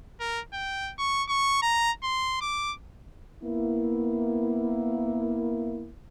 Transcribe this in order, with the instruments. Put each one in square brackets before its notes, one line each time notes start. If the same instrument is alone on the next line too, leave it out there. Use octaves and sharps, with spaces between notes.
[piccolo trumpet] A#4
G5
C#6
C#6
A#5
C6
D6
[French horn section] A#3 B3 E4